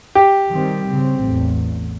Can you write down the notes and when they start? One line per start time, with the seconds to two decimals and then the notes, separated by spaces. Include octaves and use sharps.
0.15 G4
0.50 D#3 G3 C4
0.90 C#3 C4
1.23 A1 E2